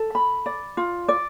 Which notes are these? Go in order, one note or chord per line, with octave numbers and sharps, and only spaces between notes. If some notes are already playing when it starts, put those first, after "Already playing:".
Already playing: A4
B5
D5
F4
D5